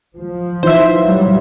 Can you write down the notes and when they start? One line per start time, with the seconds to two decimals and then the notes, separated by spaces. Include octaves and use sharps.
0.16 F3
0.63 E3 D#4 F4 C5 E5
1.02 F#3 G3